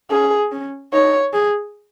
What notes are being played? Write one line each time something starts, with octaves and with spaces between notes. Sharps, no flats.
C#4 G#4
C#4
D#4 C#5
G#4